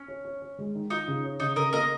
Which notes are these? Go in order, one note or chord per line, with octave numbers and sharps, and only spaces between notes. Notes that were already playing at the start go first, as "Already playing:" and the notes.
Already playing: C#4
C#5
C#5
C#5
G#3
D#3
D#4 F4
C#3
C#5
C#3 D#4
C#3 A#4 D#5
A#3 A#4 D#5